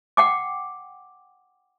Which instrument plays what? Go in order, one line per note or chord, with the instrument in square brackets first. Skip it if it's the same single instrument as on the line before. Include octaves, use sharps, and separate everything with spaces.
[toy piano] F#5 G5 D6